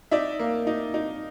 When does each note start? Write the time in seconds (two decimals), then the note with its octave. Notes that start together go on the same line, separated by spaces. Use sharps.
0.11 D#4 D5 E5
0.39 A#3
0.67 D#4
0.94 D#4